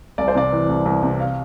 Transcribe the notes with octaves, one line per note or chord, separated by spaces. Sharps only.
C2 D5
C5
C3 D5
E3
C2
C2
C3
F5